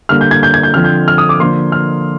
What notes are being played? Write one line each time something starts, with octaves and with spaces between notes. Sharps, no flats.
D3 G3 A#3 F6
G6
G#6
G6
G#6
G6
D3 F3 C4 F6
G6
F6
D#6
D6
D3 F3 A#3 C6
F6